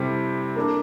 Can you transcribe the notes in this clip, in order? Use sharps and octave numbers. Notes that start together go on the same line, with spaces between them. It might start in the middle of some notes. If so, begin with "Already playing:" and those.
Already playing: C3 G3 C4 E4 A4
A#3 D4 A4